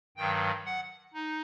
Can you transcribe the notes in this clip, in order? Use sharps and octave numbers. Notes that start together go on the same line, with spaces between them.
G2 D#3 F#3 G5
F#5
D#4